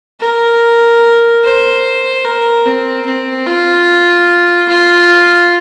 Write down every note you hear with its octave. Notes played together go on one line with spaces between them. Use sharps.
A#4
C5
A#4
C4
C4
F4
F4